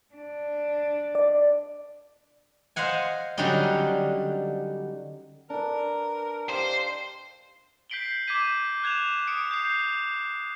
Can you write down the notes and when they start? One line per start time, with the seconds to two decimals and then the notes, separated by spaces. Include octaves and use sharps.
0.15 D4
1.15 D5
2.76 C5 D#5 F5 F#5 G#5
3.37 D3 F#3 G3 C#4 D#4
5.50 D4 A#4 B4
6.49 G4 C5 D#5 F5
7.90 G6 B6 C7 D7 F#7 G7
8.27 D6 G6 G#6 B6 D#7
8.83 F#6 G#6 E7 F7
9.27 D#6 C#7 D7
9.51 G6 C7